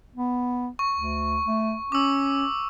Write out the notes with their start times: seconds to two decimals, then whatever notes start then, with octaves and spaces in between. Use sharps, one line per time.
0.15 B3
0.79 C#6
0.97 D2
1.46 A3
1.92 C#4 D6 E6